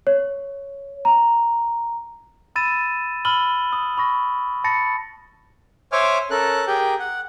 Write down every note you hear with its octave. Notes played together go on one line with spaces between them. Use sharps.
C#5
A#5
B5 E6 A6 D#7 E7
B5 E6 F6 F#7 G7
D#6
B5 C#6 A#6
A5 B5 A6 A#6 C#7
C5 C#5 E5 G#5 D6 F6
C#4 A4 A#4 F#6
G4 G#4 A#4 G5
F#5